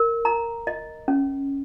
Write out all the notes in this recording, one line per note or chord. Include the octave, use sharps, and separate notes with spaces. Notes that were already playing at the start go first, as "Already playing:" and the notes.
Already playing: A#4
A#5
D#5
C#4